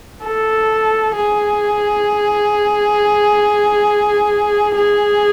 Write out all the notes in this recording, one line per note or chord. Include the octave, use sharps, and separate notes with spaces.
A4
G#4
G#4